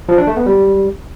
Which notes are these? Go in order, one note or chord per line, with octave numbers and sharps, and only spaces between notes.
F3
D4
A3
B3
G3